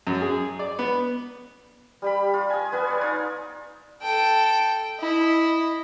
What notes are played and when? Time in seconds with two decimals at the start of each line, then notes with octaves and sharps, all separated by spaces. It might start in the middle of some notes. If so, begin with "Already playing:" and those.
0.07 F#2
0.21 G#4
0.59 D5
0.79 B3
2.02 G3 G4 B5
2.34 F4
2.50 D#5 G#5
2.72 B3 B4 F#5 G#5
2.87 C#5 D5
3.01 D#4 F4
4.02 A4 G5
5.00 E4 D#5